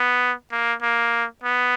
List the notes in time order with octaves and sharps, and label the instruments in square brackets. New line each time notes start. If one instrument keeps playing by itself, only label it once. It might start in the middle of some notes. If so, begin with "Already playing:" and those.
Already playing: [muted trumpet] B3
A#3
A#3
B3